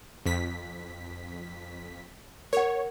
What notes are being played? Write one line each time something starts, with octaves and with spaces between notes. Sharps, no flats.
F2 B6
A#4 C#5 F#5